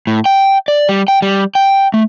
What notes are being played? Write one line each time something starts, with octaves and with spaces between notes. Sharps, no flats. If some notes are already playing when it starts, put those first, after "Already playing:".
A2
G5
D5
G3
G5
G3
G5
A3